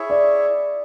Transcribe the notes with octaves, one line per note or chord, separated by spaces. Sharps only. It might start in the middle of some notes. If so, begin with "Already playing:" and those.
Already playing: E4 G#4 C#5 E5
D5